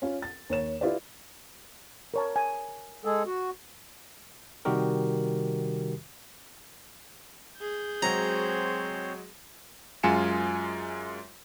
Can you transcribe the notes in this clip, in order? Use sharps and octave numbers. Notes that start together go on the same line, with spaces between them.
C#4 F4
A6
D#2 C#5 E7
E4 F4 G4 B4 D5
A#4 C#5 A5
G#5
G#3 G#4 A4
F#4
C3 D#3 G3 F#4 G4 A#4
G#4 G6
F#3 G#3 C4 F#4 C5 C#5 A#5
F#2 G#3 F4 G#5 C#7 E7